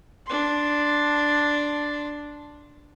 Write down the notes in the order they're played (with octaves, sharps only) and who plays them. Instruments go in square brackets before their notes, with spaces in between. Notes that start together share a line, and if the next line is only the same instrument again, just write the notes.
[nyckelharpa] D4 C6